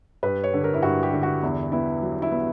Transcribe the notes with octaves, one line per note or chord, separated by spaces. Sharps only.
G2 B4
C#5
D3
A#4
E4
G2 F#4
G4
D3
F#4
E2 E4
B3 E4
F#3
E4
B3